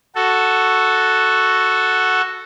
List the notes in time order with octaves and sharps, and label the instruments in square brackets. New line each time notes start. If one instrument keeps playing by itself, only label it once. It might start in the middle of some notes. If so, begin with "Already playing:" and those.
[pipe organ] F#4 A4